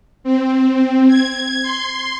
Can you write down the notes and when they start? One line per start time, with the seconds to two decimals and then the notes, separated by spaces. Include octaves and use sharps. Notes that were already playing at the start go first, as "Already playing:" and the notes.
0.24 C4
1.08 G#6
1.62 C6